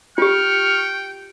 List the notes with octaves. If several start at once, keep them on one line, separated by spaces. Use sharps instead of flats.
F4 G4 G5 C#6 F6